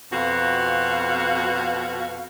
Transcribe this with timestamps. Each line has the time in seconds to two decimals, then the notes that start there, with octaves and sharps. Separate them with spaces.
0.13 F2 B2 F#4 F5